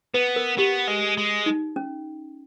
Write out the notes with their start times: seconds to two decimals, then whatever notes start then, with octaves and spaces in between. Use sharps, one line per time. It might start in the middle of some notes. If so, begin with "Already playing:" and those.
0.14 B3 B4
0.36 A#4
0.58 B3 G4
0.88 G#3
1.17 G#3
1.46 D#4
1.76 C#4